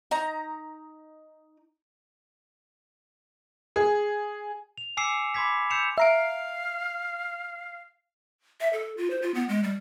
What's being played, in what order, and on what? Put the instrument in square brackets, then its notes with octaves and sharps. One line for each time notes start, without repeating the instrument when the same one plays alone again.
[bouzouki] D#4 A#5
[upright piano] G#4
[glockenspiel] F7
G#5 D6 E6 C7 C#7 E7
B5 C6 D6 G#6 B6
E6 G6 C7 C#7 E7 F7
[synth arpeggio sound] E5 A#5 D7 [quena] F5
[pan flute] E5
A4
F4
C5
F4
B3
G#3
G3